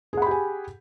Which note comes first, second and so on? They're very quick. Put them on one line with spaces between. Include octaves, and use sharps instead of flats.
G#4 F#5 B5 G4 G#5